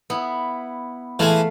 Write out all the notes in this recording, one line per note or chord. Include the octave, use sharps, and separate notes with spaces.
B3 E4
E3 G#3 A3 F5 A5